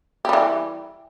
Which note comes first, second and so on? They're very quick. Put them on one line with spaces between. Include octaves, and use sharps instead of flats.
G4 G3 E3